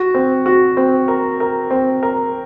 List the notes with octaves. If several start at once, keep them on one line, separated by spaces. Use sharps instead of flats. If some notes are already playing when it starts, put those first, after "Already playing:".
Already playing: F#4
C4
F#4
C4
A#4
A#4
C4
A#4